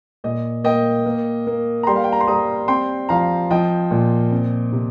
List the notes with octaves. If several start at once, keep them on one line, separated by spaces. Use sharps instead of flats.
A#2 D#5
A#3 D#5 G5
A#3
A#3
A#5
G3 G5 C6
F5
G5
A#5
C6
G3 A#5 D#6
C4 G5 C6
F3 F5 A#5
F3 D#5 G5
A#2
C4
C3